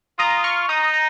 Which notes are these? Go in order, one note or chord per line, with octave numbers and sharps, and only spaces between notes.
F4 A#5 D#6
C#6 F6
D#4 A#5 D#6
A#5